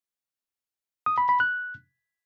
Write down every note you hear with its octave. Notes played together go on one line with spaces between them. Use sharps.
D#6
B5
B5
F#6